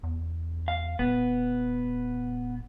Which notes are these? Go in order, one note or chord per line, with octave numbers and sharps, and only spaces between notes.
E2
F5
D#1 B3